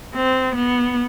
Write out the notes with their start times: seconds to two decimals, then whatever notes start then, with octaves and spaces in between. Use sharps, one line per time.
0.15 C4
0.55 B3